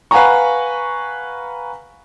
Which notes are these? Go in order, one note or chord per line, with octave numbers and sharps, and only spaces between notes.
B4 F5 F#5 G#5 A#5 C#6